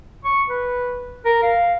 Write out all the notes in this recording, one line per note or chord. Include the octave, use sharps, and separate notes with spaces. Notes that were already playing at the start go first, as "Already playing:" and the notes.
C#6
B4
A#4
F5